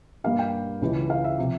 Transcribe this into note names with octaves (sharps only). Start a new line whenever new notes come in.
G2 G3 A#3 F5
G5
C#2 C#3 E3 G#3
F5
E5
C3 F3